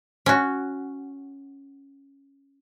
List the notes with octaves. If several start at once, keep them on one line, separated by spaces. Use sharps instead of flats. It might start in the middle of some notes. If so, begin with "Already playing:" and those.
C#4 F#4